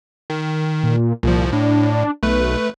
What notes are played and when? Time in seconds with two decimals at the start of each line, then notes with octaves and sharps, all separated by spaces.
0.30 D#3
0.83 A#2
1.23 C2 A#2 F3
1.53 A2 D4
2.23 B1 A3 B4